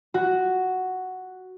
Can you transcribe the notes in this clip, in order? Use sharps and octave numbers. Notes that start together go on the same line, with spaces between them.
F#4